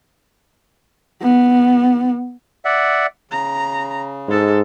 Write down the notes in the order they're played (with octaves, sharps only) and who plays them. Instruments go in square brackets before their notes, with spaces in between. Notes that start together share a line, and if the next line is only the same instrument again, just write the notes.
[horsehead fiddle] B3
[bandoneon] D5 E5 F#5
[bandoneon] C#3 [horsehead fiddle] A#5
[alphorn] G#2 [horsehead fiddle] G#3 A4